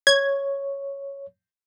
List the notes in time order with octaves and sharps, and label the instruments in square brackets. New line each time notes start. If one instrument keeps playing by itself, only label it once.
[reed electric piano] C#5 [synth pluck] G#6